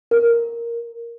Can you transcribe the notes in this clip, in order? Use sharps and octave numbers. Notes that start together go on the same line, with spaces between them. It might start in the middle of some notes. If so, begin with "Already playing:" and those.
A#4